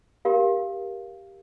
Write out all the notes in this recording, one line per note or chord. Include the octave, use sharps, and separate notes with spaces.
G4 A#4 F5